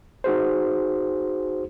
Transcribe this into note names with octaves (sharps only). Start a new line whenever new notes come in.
D#4 F#4 G#4 C5